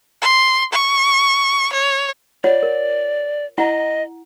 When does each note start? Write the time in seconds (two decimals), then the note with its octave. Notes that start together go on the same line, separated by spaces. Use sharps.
0.22 C6
0.72 C#6
1.73 C#5
2.44 F4 C#5 D5 F#5
2.63 A#4
3.58 E4 D#5 F#5 A#5